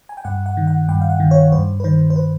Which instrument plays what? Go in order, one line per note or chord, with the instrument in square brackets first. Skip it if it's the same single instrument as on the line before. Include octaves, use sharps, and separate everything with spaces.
[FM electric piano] G#5
G5
G2 F#5
F#5
D#3
F#5
G2 G5
F5
F#5
D#3
C#5
G2 C5
B4
D#3 C5
C5
B4